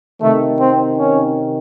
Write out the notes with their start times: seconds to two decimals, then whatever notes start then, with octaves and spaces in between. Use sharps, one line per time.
0.21 C3 D#3 A3
0.60 C4
0.97 C#4